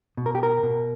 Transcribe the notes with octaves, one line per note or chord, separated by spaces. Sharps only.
B2
A#4
G4
A#4
B2